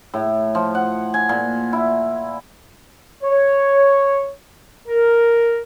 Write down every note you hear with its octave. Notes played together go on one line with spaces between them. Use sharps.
A2
F3
F#5
G#5
A#2
E4
C#5
A#4